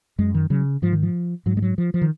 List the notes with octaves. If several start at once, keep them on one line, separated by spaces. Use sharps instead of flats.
F#2 G#3
D#3
C#3 F#3
G#2 F3
D#3
F3
G#2 F#3
G#3
F#3
F3
F3
D#3